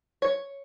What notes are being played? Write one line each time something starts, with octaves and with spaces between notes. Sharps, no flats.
C#5